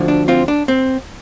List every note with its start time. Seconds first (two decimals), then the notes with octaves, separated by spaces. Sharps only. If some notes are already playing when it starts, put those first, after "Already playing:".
Already playing: D2 D3 F3
0.08 D4
0.28 C4 F4
0.48 D4
0.68 C4